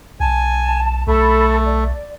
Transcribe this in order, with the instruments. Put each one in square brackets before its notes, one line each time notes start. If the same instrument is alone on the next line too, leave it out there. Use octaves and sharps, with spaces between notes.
[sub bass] B1 [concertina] G#5 [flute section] A5
[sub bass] B1 [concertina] A3 [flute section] A4 B5
[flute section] D5